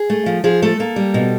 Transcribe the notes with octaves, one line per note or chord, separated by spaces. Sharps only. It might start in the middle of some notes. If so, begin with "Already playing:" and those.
Already playing: G#4
A3
F3
F3 G#4
A3 A4
A#3
G3
B2